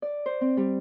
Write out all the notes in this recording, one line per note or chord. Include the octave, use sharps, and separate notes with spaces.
D5
C5
C4
G3